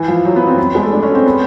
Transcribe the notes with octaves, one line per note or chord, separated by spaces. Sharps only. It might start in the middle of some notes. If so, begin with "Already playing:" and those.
Already playing: E3
F3
F#3
B3
C4
B3
G#3
A3
D4
C#4
C4
B3